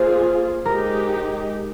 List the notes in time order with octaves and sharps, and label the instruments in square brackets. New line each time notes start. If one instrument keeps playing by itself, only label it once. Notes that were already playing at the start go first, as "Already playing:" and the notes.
Already playing: [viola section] A#3 F4 G#4 [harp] C5
[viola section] G#3 D#4 G4 [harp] A#4